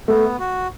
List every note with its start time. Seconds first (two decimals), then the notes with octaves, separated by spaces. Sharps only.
0.08 A3 B3
0.39 F#4